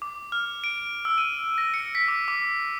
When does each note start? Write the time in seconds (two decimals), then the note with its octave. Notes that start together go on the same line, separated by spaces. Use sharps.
0.02 D6
0.32 F6
0.64 D7
1.05 E6
1.18 D#7
1.58 A#6
1.74 C#7
1.95 B6
2.08 D6
2.28 D6